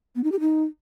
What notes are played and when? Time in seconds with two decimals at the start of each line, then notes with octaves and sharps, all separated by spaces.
0.16 B3
0.24 D#4
0.32 G4
0.40 D#4